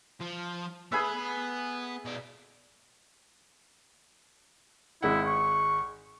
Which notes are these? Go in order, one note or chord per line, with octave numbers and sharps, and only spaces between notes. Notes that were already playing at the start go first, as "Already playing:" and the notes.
F3
B3 G#4 B4 E5 B5
B2 D5
G#1 G#3 E4 F#5
C#6